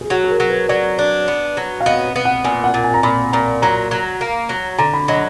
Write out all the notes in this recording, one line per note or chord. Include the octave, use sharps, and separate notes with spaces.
G#4
F#3 F#4
G#4
A#4
F#3
B4
F#3 D5
D4
B3
F#3
F5
B3 D#5
B3
F#5
A#2 G#5
F#5
A#2
G#5
A#5
A#2 B5
A#2 A#5
F#3 A#5
F#3
A#3
F#3
D3 A#5
B5
F#3 D#5